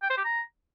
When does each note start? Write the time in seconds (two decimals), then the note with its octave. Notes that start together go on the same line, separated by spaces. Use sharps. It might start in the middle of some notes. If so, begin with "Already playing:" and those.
0.03 G5
0.10 C5
0.17 G4
0.25 A#5